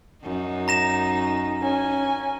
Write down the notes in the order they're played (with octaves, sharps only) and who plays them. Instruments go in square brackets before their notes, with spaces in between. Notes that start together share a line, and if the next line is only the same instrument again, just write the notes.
[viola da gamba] F#2 D#4
[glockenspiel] A#5 A#6 E7
[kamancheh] C#4 G#5